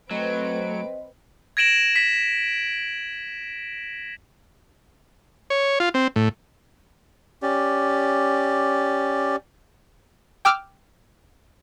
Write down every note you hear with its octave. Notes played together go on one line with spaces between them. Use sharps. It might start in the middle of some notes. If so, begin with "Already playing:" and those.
F#3 A3 C4 B4 D#5 D7
G#6 A#6 D7 E7 F#7
B6
C#5
F4
C4
A2
C#4 G4 D5
G5 D6 E6 F6